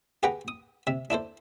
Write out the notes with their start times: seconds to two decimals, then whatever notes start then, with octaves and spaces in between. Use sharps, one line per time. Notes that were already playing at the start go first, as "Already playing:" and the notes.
0.23 G4 G#4 B4 F#5 G5 A#5
0.48 D#6
0.87 C3 E5
1.10 D4 E4 A4 C5